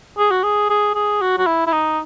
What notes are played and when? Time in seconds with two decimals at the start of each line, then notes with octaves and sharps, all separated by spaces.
0.18 G#4
0.31 F#4
0.44 G#4
0.70 G#4
0.95 G#4
1.21 F#4
1.38 F#4
1.46 E4
1.67 E4
1.72 D#4